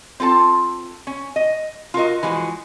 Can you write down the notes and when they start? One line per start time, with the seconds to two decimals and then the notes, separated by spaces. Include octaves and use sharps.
0.20 C4 F4 A4 A5
1.07 C#4
1.36 D#5
1.94 F4 F#4 A#4 D#5
2.23 E3 F3 G#3 F#4 G#4